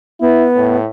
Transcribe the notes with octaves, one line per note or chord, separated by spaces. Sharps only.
B3 E4
A2